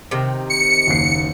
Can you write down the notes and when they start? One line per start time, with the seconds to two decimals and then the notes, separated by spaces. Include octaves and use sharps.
0.11 C3 D#3
0.50 C#7
0.87 F#1 D#2 C7